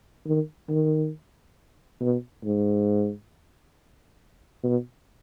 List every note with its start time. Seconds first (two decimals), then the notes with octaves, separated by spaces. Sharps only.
0.26 D#3
0.69 D#3
2.01 B2
2.44 G#2
4.63 B2